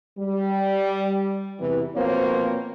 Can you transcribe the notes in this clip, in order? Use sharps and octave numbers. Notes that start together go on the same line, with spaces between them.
G3
E2 C3 E3
B2 F3 A#3 C4 C5 C#5